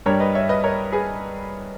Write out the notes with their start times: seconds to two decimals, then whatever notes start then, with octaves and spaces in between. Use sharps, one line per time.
0.06 G2 G3 A#4 C#5
0.20 B4 D#5
0.35 C#5 E5
0.49 B4 D#5
0.64 A#4 C#5
0.92 G#4 B4